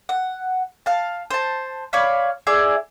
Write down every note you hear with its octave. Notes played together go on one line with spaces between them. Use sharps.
F#5
F5 A5
C5 A5
C#5 D5 F5 B5
E4 G#4 D5